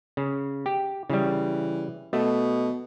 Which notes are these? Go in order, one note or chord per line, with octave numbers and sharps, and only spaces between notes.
C#3
G4
C#3 E3 G3
B2 A3